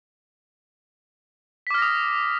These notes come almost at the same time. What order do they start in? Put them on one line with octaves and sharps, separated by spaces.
B6 D6 F6 A#6 D#6